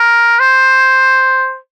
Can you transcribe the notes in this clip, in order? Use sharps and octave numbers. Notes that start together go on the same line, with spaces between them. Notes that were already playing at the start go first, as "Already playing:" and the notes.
Already playing: A#4
C5